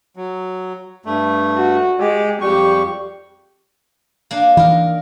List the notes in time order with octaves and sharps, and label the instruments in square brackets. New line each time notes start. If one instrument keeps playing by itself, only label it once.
[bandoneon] F#3
G2 A3
[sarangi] F#4
[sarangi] G#3 [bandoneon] G4
[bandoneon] F2 G3 C#6 [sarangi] G4
[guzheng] A#3 D4
[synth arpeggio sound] E3 [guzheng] D#4 A#4